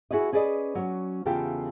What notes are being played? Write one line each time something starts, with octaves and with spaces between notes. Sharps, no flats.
E4 F#4 G#4 B4 D#5
C#4 G#4 B4 D5 D#5
F#3 C#4
E2 C#3 F4 G4 A4 G5